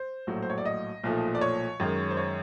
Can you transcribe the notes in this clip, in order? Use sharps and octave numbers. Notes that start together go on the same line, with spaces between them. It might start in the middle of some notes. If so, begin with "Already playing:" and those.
Already playing: C5
A#1 A2 F#3 A3
C5
C#5
D5
D#5
B1 A#2 F3 A3
D5
C#5
F#2 D#3 G#3
C5
C#5